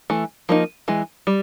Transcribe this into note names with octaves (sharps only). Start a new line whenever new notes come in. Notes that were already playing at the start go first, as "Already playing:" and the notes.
E3 A3
F3 A#3 D#4
E3 G#3
G3